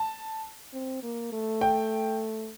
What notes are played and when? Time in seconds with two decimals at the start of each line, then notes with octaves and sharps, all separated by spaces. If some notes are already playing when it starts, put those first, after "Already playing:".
Already playing: A5
0.73 C4
1.03 A#3
1.33 A3
1.61 G5